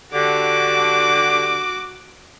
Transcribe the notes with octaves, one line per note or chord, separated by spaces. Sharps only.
D3 F#4 G4 D6